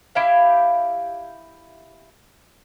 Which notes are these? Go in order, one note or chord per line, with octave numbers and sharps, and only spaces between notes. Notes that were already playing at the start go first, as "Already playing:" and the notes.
E4 G4 E5 F5